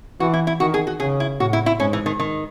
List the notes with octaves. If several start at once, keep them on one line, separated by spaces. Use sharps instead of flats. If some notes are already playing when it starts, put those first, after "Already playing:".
E3 F#4
E4
E4
D#3 F#4
G#4
F#4
C#3 G#4
E4
A2 F#4
E4
E4
G#2 C#4
E3
D#3
D#3